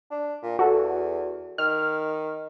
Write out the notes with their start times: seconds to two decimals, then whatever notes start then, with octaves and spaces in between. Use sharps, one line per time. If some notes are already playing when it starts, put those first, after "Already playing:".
0.11 D4
0.43 A#2
0.59 E2 F#4 A4
1.58 D#3 F6